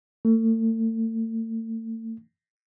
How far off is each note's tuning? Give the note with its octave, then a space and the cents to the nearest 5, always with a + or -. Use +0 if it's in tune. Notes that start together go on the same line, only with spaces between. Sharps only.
A3 +40